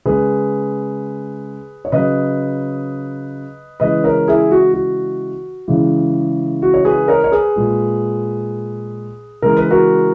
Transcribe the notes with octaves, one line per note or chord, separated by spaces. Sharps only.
C#3 G#3 G#4 B4
C#5
C#3 F#3 B4 D#5
C#3 E3 G#3 B4 D#5
A#4 C#5
E4 G#4
F#4
F#4
C#3 E3 G#3
F#4
C#5
G#4 B4
A#4 C#5
C#5
G#4 B4
A#2 G#3
C#3 E3 G#3 A#4
B4
F#4 A#4